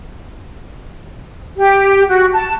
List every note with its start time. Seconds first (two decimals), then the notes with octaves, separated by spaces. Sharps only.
1.57 G4
2.09 F#4
2.34 A5